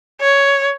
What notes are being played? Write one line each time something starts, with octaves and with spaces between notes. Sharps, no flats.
C#5